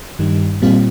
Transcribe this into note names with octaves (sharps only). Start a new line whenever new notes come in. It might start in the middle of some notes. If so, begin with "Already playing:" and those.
G2 D#3 G3
A#2 G3 C4 F4